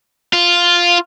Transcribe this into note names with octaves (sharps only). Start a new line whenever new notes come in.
F4